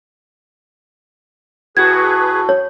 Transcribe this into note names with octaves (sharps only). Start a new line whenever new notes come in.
A2 F#4 G#4 B4 G#6
C#5